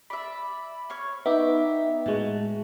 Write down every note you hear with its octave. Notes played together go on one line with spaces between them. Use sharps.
D5 E5 B5
C#5 C#6 F6
B3 D#4 E5 G5 D6
A2 G#3 F#4 A5